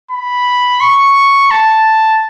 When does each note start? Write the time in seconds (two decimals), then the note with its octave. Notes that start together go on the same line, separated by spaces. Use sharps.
0.11 B5
0.81 C#6
1.51 A5